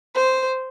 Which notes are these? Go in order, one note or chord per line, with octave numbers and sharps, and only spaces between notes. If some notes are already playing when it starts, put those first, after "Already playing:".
C5